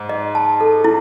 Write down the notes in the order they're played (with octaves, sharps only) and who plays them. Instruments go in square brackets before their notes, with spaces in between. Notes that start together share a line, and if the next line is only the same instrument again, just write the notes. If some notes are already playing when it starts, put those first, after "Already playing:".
Already playing: [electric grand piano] G#2
[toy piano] D#5
A5
A4
E4